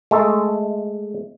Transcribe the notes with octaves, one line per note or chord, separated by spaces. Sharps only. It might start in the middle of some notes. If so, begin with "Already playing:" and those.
G#3 A3 A4